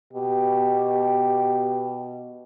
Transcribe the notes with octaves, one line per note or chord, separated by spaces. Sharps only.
B2 G4